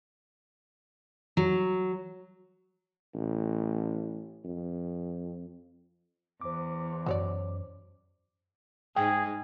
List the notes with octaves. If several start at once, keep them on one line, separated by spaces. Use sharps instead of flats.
F#3
A1
F2
E2 C5 D6
F#2 F#3 C#5 D5
G#2 D#4 G#4 G5